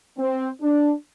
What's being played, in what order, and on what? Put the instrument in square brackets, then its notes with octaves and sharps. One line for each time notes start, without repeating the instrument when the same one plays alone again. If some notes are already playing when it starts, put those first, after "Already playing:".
[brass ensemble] C4
D4